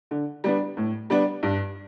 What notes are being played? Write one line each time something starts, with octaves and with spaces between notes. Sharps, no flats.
D3
G3 B3 D4
A2
G3 B3 D4
G2